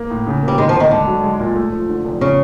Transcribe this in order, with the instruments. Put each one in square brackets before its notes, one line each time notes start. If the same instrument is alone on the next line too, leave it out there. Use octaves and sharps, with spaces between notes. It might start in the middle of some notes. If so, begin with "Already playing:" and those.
Already playing: [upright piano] A#3
A2
C#3
A#3
[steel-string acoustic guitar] G3
[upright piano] D#3 [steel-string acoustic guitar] G#3
[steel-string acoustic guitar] F3
[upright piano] D2
[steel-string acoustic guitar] D#3
[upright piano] G#2 [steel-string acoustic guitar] D3
[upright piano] F#3
G#3
A#2
A3
F3
D3
F1
[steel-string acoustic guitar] C#3